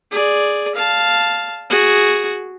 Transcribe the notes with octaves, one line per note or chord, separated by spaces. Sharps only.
G#4 D5
F5 A5
F#4 G#4